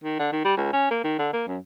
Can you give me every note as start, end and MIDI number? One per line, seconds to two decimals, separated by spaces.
0.04 0.17 51
0.20 0.29 50
0.32 0.42 51
0.45 0.55 55
0.57 0.70 37
0.73 0.88 61
0.91 1.00 58
1.04 1.15 51
1.19 1.30 50
1.33 1.43 58
1.47 1.58 42